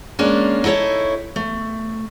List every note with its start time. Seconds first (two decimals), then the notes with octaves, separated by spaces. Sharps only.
0.19 G#3 A#3 C#4 D4
0.64 D#4 E4 A4 A#4 C#5
1.36 A3